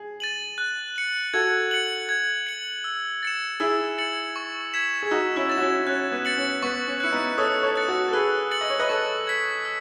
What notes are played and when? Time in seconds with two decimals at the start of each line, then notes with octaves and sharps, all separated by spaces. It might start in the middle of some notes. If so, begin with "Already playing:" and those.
Already playing: G#4
0.20 A6 D#7 F#7
0.58 F#6
0.96 C#7 F#7
1.33 F#4 A4 G#6
1.71 C#7 F#7
2.09 G#6
2.47 C#7 F#7
2.84 E6
3.23 A6 C#7 E7
3.60 E4 G#4 E6
3.98 A6 C#7 F#7
4.36 C#6
4.74 G#6 B6 E7
5.02 G#4
5.11 D#4 F#4 E6
5.36 C#4 E4
5.49 A6 E7
5.57 F#4
5.61 C#4 E4
5.87 C#4 F#6
6.11 B3
6.25 A6 C#7 F#7
6.37 C#4
6.62 B3 C#6
6.87 C#4
7.00 E4 F#6 C#7
7.12 B3 D#4
7.38 A4 C#5 D#6
7.63 A4 C#5
7.75 F#6 A6 C#7
7.88 F#4 A4
8.08 A4
8.13 G#4 B4 E6
8.51 A6 C#7 F#7
8.61 D#5
8.70 C#5
8.79 B4 D#5
8.89 A4 C#5 C#6
9.27 G#6 B6 F#7
9.65 E6